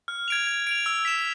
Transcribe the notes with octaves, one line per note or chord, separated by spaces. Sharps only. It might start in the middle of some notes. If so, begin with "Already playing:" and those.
F6
G#6 D7 F7
G#6
D7 F7
E6
B6 E7